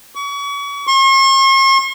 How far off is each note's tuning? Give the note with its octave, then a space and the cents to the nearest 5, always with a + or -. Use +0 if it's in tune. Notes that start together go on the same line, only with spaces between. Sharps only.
C#6 +35
C#6 -45